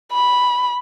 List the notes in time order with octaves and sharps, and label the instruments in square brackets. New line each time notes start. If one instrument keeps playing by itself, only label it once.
[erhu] B5